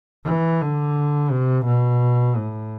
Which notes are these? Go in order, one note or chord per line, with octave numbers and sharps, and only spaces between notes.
E3
D3
C3
B2
A2